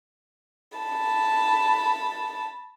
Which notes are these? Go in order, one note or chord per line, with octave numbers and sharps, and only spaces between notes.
A5 B5